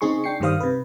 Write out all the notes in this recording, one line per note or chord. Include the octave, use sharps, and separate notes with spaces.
C#3 C4 D#4 G#4 C6 C#6
D4 G5 C7 C#7
G2 D#3 G3 C5 F5 D#6
C3 B4